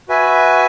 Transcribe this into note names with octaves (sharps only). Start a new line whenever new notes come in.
F#4 B4 E5 G#5